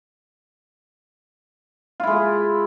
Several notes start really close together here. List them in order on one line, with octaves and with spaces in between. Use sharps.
F4 E4 G#3